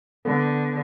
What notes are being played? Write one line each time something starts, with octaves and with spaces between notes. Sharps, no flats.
D3 B3